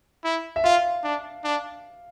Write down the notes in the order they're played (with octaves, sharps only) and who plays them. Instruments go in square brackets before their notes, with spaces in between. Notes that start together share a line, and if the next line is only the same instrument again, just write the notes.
[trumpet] E4
[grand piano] E5
[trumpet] F4 [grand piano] F5
[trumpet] D4
D4